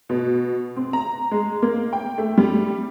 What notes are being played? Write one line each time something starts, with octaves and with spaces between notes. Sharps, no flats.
B2
C4
A#5
G#3
A#3
G5
A3
G3